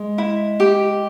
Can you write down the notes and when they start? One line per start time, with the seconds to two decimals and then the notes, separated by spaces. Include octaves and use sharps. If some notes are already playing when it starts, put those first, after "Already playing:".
Already playing: G#3
0.18 E4
0.60 G4